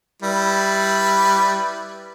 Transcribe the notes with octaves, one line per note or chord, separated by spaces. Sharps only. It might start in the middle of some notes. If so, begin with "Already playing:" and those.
G3 E4 B4